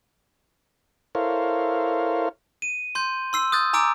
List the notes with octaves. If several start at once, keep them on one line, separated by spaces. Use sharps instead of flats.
E4 A4 A#4 C5 C#5 F5
D#7
C6 G6
C6 E6 C7
D#6 F#6 G6 A6
G#5 A#5 D6 E6 D7